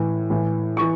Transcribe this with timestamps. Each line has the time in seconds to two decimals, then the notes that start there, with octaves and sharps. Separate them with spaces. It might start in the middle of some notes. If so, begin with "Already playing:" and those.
Already playing: A2 E3
0.30 A2 E3
0.77 E3 C#6